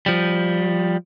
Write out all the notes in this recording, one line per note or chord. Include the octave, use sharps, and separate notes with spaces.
F3 G3